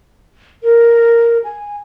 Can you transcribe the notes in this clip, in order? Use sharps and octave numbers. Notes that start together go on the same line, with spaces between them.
A#4
G#5